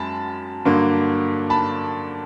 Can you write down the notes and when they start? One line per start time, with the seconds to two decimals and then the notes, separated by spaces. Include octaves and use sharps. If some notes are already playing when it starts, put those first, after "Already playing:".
Already playing: F#2 G#3 A5 B5
0.65 G2 D3 F#3 A#3
1.50 A5 B5